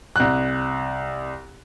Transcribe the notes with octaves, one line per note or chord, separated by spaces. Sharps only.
C2 F#6